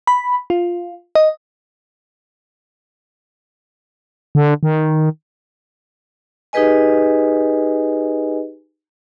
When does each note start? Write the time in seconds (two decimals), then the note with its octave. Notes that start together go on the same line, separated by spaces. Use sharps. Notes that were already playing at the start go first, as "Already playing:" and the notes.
0.07 B5
0.50 F4
1.15 D#5
4.35 D3
4.63 D#3
6.53 D#4 G4 G#4 B4 D#5 G#5